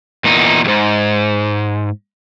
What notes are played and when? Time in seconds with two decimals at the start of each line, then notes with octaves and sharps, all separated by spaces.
0.24 E2 A#2 D#4
0.65 E2 G#2